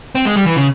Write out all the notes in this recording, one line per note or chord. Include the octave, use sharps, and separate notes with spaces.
C4
G#3
G3
E3
C#3